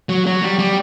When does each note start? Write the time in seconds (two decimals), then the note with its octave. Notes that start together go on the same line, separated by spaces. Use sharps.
0.09 F#3
0.26 F#3
0.42 G3
0.59 G3